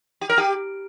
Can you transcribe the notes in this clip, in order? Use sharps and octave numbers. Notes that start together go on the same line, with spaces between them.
G4
A#4
G4